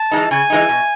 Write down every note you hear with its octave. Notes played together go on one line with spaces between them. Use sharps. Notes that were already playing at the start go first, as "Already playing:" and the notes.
Already playing: A5
E3 G#3 D#4
C#3 G#5
E3 G#3 D#4
B2